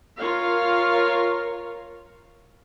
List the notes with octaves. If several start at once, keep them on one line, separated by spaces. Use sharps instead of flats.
F4 A#4 C#5 F5